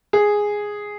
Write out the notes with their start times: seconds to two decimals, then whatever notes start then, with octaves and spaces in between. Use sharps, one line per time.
0.13 G#4